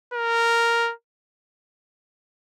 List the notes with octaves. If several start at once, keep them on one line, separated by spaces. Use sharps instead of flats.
A#4